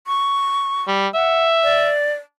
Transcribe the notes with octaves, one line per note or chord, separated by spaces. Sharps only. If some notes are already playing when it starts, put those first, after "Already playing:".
C#6
G3
E5 F#5
D5